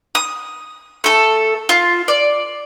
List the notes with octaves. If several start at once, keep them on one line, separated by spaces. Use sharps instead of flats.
D#6
A3 A4
F4
D5